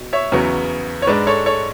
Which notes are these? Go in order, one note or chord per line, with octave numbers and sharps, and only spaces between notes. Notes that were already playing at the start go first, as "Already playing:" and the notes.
Already playing: B2
C#5 E5
E2 C#3 F#3 B3
C#5
G#2 G#3 D4 B4 D5
A4 C#5
A4 C#5